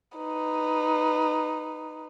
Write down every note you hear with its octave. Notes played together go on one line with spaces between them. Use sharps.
D#4 B4